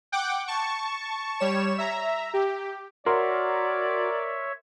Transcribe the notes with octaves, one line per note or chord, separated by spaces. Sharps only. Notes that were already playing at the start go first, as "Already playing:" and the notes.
F#5 G5 D6
A5 C#6
G3 C#5 E7
E5 A#5
G4
F#4 A#4 C#5 D5 E5 C6